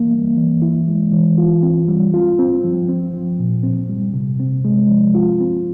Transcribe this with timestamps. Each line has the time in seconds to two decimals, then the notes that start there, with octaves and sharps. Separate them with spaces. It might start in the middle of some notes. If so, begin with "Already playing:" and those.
Already playing: E3 A#3
0.12 G3
0.37 E3
0.62 E4
0.88 G#3
1.13 E3
1.38 F4
1.63 C4
1.88 G3
2.14 F4
2.39 C4
2.64 F3
2.89 C4
3.13 F3
3.40 A#2
3.64 C4
3.90 G3
4.14 C3
4.40 C4
4.65 G#3
4.90 F3
5.15 F4
5.40 C4